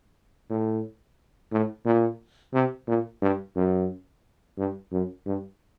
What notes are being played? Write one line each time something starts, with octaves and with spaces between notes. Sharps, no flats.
A2
A2
A#2
C3
A#2
G2
F#2
G2
F#2
G2